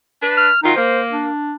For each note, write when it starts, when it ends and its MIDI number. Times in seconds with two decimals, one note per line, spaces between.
0.21 0.47 62
0.21 0.47 71
0.37 0.59 89
0.63 0.72 51
0.63 0.72 54
0.63 0.72 63
0.63 0.72 65
0.76 1.26 58
0.76 1.00 72
1.12 1.55 62